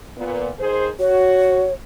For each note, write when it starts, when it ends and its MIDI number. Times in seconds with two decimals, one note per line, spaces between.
0.17 0.49 46
0.17 0.49 59
0.58 0.89 51
0.58 0.89 68
0.58 0.89 72
1.00 1.66 66
1.00 1.73 73